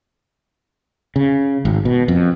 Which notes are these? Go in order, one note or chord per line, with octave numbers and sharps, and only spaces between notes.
C#3
G#1
B2
F2